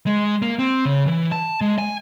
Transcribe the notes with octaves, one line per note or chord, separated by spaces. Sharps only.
G#3
A#3
C4
C#3
E3
A5
G#3
G#5